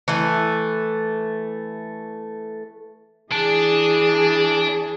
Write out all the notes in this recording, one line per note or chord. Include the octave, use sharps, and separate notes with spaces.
E3 A3
E3 D4 G#4